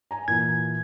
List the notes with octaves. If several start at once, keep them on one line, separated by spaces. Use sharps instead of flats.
G#5 A#5
A#2 E3 G#6